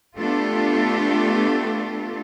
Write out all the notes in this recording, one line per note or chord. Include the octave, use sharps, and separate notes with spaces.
A3 B3 D4 F4 G4 A4